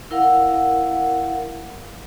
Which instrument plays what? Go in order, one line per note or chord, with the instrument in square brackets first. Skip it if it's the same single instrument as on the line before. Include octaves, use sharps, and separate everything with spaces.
[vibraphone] E4 A#4 F5 F#5